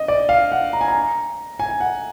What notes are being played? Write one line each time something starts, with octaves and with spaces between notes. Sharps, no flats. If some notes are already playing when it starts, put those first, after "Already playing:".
Already playing: D#5
D5
F5
F#5
A#5
G#5
A#5
G#5
F#5